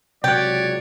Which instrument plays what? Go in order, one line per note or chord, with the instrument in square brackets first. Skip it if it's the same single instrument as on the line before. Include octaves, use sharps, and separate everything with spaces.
[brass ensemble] C#2 F#3 [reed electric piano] C3 F#6 [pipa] G4 [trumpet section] C#5 D5